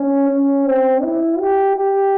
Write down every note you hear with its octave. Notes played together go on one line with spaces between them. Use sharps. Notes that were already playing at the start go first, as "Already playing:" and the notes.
Already playing: C#4
C#4
C4
E4
G4
G4